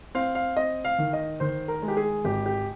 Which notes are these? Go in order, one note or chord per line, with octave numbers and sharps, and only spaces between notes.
C4 F5
F5
C4 D#5
F5
D#3
D#5
D#3 C5
A#4
G#3
G4
G#4
G#1 G4
G4